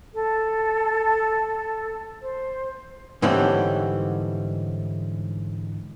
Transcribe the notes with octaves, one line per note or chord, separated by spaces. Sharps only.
A4
C5
G#2 D3 E3 G3 C4 C#4